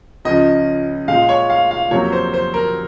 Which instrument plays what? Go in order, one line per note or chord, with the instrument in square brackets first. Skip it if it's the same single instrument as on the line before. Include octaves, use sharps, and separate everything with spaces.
[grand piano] C#2 C#3 F3 D#5
A#2 G#3 F5
C#5
F5
F5
F2 C3 F#3 A#3 C#5
C5
C5
A#4